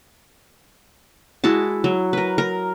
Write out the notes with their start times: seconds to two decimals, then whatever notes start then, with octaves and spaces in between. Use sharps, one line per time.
1.44 G#3 E4 F#4 A5
1.84 F#3
2.13 A#4 B4
2.38 A#4